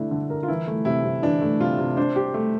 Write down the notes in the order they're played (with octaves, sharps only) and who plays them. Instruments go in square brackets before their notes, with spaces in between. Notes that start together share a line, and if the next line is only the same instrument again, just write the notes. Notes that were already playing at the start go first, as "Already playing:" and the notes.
Already playing: [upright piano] D3 A3 E4 [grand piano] D4
[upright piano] D3
A#4
[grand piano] F4
[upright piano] E3 [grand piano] E4
[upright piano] A3
[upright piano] C3 [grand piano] E4
[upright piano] C3
[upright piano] E3 [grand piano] D4
[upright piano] A3
[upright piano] C3 [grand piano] F4
[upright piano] C3
[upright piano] D4 [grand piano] C5
[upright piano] G4
A3